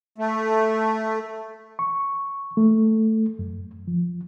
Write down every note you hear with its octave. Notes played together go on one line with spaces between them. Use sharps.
A3
C#6
A3
F#2
F3